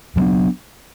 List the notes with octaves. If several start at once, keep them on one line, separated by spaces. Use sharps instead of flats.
G2 F#3 B3 D4